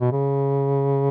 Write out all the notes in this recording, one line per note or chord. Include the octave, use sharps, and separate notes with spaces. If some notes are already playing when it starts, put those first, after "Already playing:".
B2
C#3